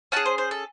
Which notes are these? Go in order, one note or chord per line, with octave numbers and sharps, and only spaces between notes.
C#4 G#4 F#5 A5
C5
C5
A4